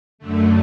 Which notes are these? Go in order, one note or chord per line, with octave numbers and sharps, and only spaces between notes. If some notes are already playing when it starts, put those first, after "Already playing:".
F#2 D3 A3